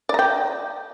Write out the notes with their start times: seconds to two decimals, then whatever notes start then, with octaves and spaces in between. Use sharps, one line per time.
0.09 D5
0.14 A#5
0.19 G5